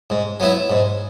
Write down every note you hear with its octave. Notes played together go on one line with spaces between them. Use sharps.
G#2
F#3 B3 E4
G#2